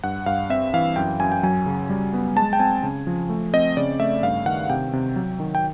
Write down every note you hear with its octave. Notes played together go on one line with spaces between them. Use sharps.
G2 F#5
G2 F5
C4 E5
E3 F5
F#2 G5
F#2 G#5
G5
F#3 G#5
C#3
G3
B3
G#3 A5
G5
C4 G#5
C#3
F3
A3
C4 D#5
C#3 D5
A3 E5
G2 F5
D#3 F#5
C3 G5
C3
F#3
D#3
G5